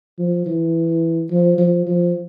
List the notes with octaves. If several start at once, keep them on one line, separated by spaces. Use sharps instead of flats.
F3
E3
F3
F3
F3